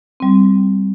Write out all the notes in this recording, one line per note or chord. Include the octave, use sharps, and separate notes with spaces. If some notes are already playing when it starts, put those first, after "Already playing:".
G3 C4